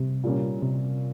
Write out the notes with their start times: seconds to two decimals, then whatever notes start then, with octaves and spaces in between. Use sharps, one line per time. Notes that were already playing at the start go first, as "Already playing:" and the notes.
Already playing: C3 G3
0.23 A#2 G3 A#3 C#4
0.63 C3